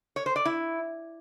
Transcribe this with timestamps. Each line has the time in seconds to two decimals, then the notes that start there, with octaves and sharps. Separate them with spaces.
0.16 C#5
0.26 C5
0.36 D5
0.45 E4